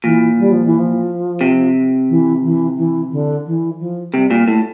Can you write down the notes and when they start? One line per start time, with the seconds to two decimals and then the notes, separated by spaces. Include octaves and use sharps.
0.04 A#2 E3
0.38 G3
0.51 F3
0.64 E3
0.78 F3
1.41 C3
2.09 E3
2.43 E3
2.77 E3
3.11 D3
3.46 E3
3.80 F3
4.14 C3 G3
4.31 A#2
4.48 A2 A3